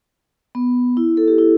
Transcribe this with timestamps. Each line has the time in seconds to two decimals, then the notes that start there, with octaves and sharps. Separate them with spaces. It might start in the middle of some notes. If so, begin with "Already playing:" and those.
0.55 B3
0.97 E4
1.17 A4
1.28 G4
1.38 E4